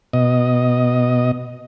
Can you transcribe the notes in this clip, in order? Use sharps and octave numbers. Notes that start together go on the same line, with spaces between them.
B2 D#5